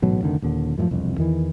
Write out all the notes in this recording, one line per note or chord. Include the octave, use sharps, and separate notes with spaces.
A1 G#2 B2 F#3
F1 D2 D3 D#3
D#1 D#2 D3
F#2 A2 D#3 F3
E1 C2 F2
E2 D#3 E3